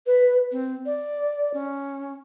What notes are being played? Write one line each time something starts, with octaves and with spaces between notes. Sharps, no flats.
B4
C4
D5
C#4